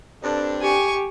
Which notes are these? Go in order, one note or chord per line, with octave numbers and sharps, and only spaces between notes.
G2 C4 D4 A4
G4 G#5 C#6